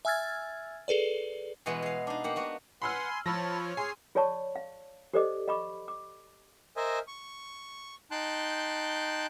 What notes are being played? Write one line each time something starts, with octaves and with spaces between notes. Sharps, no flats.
E5 G#5 E6 F6 G#6 A6
G#4 A4 B4 D5
B2 E3 G#3 B3
G#4 F5
D4 D#4
A#3 G4 F#5
B3 F#4
B4 F#5 G#5 B5 C6 E6 F6
F3 C#5 A5 B5 E6 F6 A#6
G#4 G#5 C6 C7
F4 G#4 C#5 D5 A5 C#6
F5
G4 A4 C5 D5 D#5 D6
D#5 F5 B5 C#6 D6
D6
A#4 C5 D#5 E5 G#5
C#6
D#4 G5 A5 C6 F#6 G6